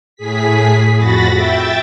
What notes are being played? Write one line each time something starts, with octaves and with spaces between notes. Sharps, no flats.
A2 G#4 B6
F2 F#4 B5 A6 A#6
E5 G5 A6